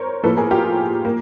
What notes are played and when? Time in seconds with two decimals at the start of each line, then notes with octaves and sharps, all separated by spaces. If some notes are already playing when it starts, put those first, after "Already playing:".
Already playing: A#4 C5 C#5
0.24 A2 F3 A#3 A4 B4
0.37 G#4 A#4
0.51 F4 G4
1.05 A#3